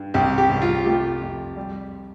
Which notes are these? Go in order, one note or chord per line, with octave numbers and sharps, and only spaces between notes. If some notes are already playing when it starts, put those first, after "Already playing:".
Already playing: G2
C2 G4
G4
C2
F4
A3 G4
F2
G3